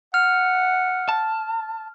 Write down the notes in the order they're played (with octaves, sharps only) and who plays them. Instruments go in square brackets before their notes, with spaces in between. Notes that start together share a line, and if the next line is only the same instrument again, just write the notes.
[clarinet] F#5 [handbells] F6
[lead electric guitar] A5